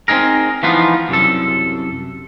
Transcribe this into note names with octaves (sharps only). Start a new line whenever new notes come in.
C4 C#4 D#4 G#4 A#4
E3 F3 B3 D#4 F4
C2 F#2 A4